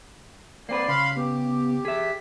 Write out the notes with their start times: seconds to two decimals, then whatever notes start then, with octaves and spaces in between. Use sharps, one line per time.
0.69 A#3 C4 B4 D5 C7
0.88 C#3 F5 B5 C6
1.17 B3 G4
1.85 G#4 E5 B6